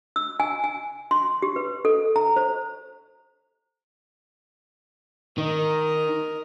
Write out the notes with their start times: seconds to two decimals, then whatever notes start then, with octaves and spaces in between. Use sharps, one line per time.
0.16 E6
0.40 G#5
0.64 G#5
1.11 C6
1.42 G4
1.56 B4
1.85 A4
2.16 A#5
2.36 C5
5.38 D#3 A#4 D#5